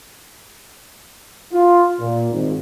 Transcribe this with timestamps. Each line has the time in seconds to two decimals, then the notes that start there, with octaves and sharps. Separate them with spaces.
1.53 F4
1.99 A#2
2.31 G#1